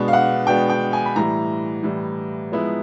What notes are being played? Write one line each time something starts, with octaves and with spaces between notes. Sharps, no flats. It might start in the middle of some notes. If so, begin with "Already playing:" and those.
Already playing: B2 G#3 B3 D4
F5
F#5
B2 G#3 B3 D4 G5
G5
G#5
B5
A2 E3 G3 A#5
A2 E3 G3
F3 G#3 B3 E4